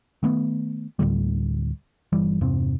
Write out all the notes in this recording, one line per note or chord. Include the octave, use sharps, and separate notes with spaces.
D#3 A3 B3
D2 A2 D3 G3
G1 E3 G3
E2 G2 C3 C4